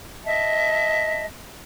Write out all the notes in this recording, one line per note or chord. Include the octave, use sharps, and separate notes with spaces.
D#5 E5 A5